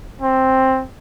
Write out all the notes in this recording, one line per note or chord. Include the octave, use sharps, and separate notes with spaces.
C4